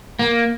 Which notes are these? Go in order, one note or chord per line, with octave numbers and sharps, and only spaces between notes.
A#3